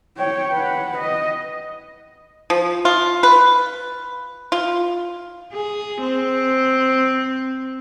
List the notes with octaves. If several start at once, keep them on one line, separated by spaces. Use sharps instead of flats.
C#5 G5
B4 F#5
D#5
F3
F4
B4
F4
G#4
C4